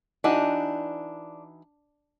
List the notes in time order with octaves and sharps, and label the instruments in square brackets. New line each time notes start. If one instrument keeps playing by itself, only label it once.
[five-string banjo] E3 D#4 F#4 [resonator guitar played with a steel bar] D4